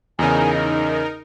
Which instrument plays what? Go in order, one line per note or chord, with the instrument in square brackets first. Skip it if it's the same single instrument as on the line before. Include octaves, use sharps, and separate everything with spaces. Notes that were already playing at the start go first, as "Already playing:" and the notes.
[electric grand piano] E2 C#3 [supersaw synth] D#4 A#4 [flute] G#5
[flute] D#5